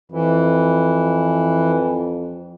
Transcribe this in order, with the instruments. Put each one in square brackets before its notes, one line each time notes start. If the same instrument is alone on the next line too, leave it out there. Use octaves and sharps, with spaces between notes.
[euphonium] F2 [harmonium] E3